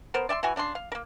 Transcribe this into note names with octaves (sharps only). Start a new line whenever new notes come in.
B3 A#4 C5
D5 E5 G5 C6
E3 E4 F#4 G#5
C#3 D4 B5 C6
F5
A#3 A#4